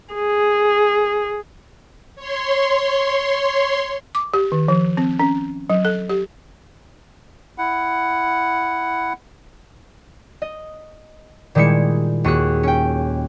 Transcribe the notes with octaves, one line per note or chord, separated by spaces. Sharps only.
G#4
C#5 C6
D6
G4
D#3
F3
C4
C#4
F#3
A4
G4
E4 F#5
D#5
A#2 D#3 G3 G#3 E4 C#7
D#2 F#4 G#4 E6 F#6
C#4 G5